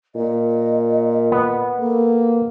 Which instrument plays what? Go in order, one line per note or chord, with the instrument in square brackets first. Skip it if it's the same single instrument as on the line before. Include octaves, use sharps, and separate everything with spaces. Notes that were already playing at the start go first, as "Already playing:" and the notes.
[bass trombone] A#2 [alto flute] D#5
[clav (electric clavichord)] B3
[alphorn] A#3 [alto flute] A4